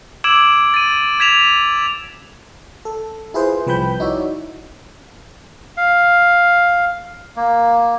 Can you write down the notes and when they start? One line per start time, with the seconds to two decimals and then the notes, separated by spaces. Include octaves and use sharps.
0.24 D6 E6 G#6 D7 E7 F#7
0.74 A6 D#7
1.20 G#6 B6 E7 F7
2.85 A4
3.34 E4 F4 G#4 B4 C5
3.67 C2 F3 B4 G5 B5 G6
4.00 D#4 E4 F#4 C#5 D5 E5
5.77 F5
7.36 A#3